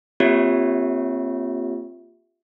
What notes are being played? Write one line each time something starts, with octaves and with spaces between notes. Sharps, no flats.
A#3 C4 F4 G4 C#5 E5